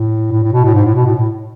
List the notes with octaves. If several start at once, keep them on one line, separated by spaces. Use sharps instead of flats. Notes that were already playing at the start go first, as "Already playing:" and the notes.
Already playing: A2
A2
A2
B2
A2
G#2
A2
B2
A2
A2